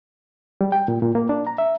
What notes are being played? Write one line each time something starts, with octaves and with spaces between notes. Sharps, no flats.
G3
G5
A#2
A#2
A#3
D4
A#5
E5